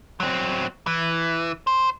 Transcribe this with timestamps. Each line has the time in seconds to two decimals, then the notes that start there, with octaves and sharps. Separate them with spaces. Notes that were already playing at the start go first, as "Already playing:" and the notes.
0.20 F#3 C4
0.87 E3
1.67 C5